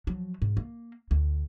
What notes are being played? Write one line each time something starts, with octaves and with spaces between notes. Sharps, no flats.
F3 F#3
G#2
A#3
D2